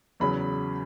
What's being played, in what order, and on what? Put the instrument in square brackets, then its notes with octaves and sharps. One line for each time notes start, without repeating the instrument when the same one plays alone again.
[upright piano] E2 C#3 F#3 C#4 B5